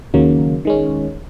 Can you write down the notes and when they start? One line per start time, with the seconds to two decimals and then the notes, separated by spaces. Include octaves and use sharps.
0.14 D#2 C#3 F#3 A#3
0.65 D#3 G#3 C#4